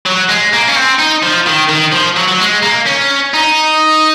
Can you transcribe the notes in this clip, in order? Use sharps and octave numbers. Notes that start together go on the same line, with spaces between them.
F#3
G#3
A#3
C#4
C4
D#4
F3
D#3
D#3
F3
F#3
F#3
G#3
A#3
C#4
D#4